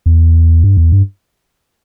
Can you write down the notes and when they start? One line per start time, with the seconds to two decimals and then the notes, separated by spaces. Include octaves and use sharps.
0.06 E2
0.64 G2
0.77 E2
0.92 G2